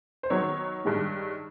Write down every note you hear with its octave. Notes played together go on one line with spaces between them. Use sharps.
C5
D#3 F#3 B3 C#5
G2 D#3 G#3